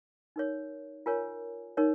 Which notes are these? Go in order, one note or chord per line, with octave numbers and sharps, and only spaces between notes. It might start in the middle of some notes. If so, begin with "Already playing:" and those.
D#4 A#4 C#5
F4 A#4 C#5 G#5
D#4 A#4 C#5